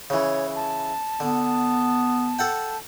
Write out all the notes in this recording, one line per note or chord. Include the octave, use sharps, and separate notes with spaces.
C#3 E3 C#5
A5
D3 B3
A4 F#5 G5